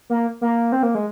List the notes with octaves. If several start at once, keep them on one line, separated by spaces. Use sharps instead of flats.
A#3
A#3
C4
A#3
G#3